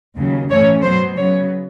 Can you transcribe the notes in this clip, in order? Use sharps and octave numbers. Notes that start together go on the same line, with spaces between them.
D#2 C#3 F#3
A2 E3 A3 C#4 C#5
B2 F#3 B3 C5
C#3 F#3 B3 C#5